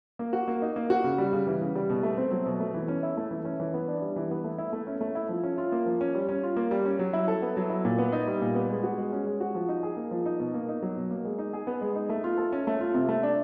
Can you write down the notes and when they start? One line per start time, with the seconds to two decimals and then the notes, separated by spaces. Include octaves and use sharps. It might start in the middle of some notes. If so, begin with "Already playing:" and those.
0.19 A#3
0.33 F#4
0.48 A#3
0.62 D#4
0.76 A#3
0.90 F#4
1.04 C#3
1.18 G3
1.33 C#3
1.47 E3
1.61 C#3
1.75 G3
1.90 B2
2.03 A3
2.17 C4
2.31 F#3
2.46 B2
2.60 A3
2.74 E3
2.88 C#4
3.03 E4
3.17 A3
3.31 E3
3.45 C#4
3.60 E3
3.74 B3
3.88 D4
4.01 G3
4.16 E3
4.31 B3
4.44 A3
4.58 E4
4.73 A3
4.87 C#4
5.01 A3
5.15 E4
5.29 F3
5.43 C#4
5.58 F4
5.72 A#3
5.86 F3
6.01 C#4
6.14 G3
6.29 C#4
6.43 F4
6.56 A#3
6.71 G3
6.85 C#4
6.99 F#3
7.13 E4
7.28 A4
7.42 B3
7.57 F#3
7.70 E4
7.85 A#2
7.98 B3
8.12 D#4
8.27 G3
8.41 A#2
8.55 B3
8.70 G#3
8.83 F#4
8.98 G#3
9.12 C#4
9.26 G#3
9.40 F#4
9.55 F3
9.69 D#4
9.83 G#4
9.97 A#3
10.11 F3
10.26 D#4
10.40 B2
10.54 A#3
10.69 D#4
10.82 F#3
10.96 B2
11.11 A#3
11.25 G#3
11.39 D#4
11.53 G#4
11.67 B3
11.81 G#3
11.95 D#4
12.09 A3
12.24 F4
12.38 A4
12.52 C#4
12.67 A3
12.81 F4
12.94 C3
13.09 A3
13.23 D4